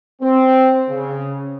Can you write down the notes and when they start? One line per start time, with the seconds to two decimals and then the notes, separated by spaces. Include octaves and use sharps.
0.21 C4
0.89 C#3